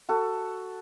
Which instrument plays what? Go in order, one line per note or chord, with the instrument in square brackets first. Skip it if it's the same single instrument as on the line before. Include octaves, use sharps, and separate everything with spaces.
[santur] F#4 A4